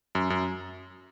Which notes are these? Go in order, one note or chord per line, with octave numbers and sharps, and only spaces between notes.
F#2
F#2